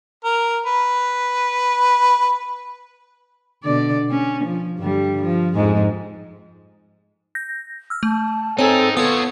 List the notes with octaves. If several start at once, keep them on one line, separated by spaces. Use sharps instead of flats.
A#4
B4
B2 D3 D5
C#4
F3
G2 D3 G3
F3
F2 G#2 G#3
G6 A#6
E6 F6
A3 A5
C4 D#4 G#4 A4 C#5 G#5
B3 F4 A4 C#5 D#6